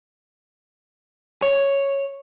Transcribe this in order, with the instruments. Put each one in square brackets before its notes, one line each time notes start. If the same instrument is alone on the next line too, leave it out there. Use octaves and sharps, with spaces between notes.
[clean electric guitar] C#5